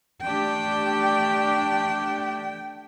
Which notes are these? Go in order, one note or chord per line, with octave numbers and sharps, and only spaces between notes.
A3 D4 G4 G5